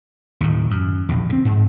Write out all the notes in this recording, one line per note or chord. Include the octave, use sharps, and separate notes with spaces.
D#2 A2
F#2
A#1 E2
D3 C4
G#2